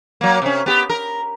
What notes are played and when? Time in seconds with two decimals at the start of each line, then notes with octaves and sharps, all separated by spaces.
0.21 F#3 A#3
0.42 C3 C#4
0.66 B3 G4
0.90 A#4